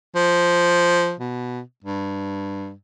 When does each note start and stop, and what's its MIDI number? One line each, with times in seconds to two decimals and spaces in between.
0.15 1.14 53
1.20 1.60 47
1.85 2.73 43